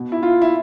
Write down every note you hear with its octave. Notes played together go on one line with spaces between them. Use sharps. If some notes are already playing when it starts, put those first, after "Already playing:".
Already playing: B2
E4
F4
E4